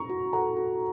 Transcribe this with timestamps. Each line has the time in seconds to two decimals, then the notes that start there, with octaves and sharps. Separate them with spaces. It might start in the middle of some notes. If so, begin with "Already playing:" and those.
Already playing: A#5 C#6
0.10 F#4
0.33 A4 F#5 A#5
0.57 F#4